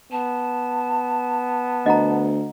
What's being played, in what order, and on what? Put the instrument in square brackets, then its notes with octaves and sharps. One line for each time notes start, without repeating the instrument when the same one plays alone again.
[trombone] B3 [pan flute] A5
[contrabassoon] D2 [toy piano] D#5 F#5 A#5